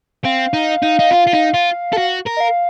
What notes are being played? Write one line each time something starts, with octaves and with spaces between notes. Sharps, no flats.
C4 F5
D#4
D#4
D#4
F4
F4
D#4
F4
A4
F#4
A#4
D#5
F5